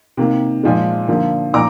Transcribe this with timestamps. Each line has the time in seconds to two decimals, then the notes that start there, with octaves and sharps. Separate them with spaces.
0.17 C3 D#3 A#3
0.63 A#2 F3 G#3
1.08 D3 F3 A#3
1.54 A#2 F3 A#5 D6